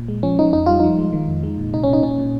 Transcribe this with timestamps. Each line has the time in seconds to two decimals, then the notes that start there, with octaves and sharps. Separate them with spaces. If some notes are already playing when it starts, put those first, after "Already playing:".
Already playing: A#2
0.08 G#3
0.23 F3 C#4
0.39 F3 D#4
0.53 F2 D#4
0.66 G3 F4
0.80 F3 D#4
0.98 G#3
1.13 D#3
1.28 F2
1.43 G#3
1.58 A#2
1.74 C3 D#4
1.84 C#4
1.88 C3 D#4
2.03 A#2 C#4
2.19 A#2